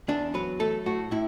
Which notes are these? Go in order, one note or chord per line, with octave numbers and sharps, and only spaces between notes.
E2 D4
F#3 B4
A3 A4
A2 F#4
A2 E4